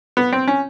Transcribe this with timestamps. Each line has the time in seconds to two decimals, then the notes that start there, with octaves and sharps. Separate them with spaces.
0.17 B3
0.33 C4
0.48 C#4